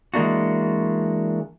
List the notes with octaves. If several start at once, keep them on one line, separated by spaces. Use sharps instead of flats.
E3 G#3 A#3 D4 F#4